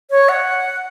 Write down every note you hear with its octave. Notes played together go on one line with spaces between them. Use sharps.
C#5
F#5